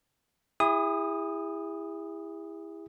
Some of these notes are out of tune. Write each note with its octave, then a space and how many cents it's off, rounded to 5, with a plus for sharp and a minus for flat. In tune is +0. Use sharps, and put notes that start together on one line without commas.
E4 +0 G#4 -40 D#6 +0